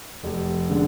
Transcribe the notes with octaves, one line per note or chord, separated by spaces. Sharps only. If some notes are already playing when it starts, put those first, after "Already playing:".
F1
D3 G#3 D4